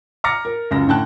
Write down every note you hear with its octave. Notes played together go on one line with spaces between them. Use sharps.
A#5 D6 F6 A6 A#6 C#7
A#4
C#2 F#2 A#6
A2 D3 G5 A5 F#6